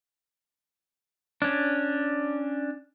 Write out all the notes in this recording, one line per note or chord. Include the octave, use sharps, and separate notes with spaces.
C#4 D4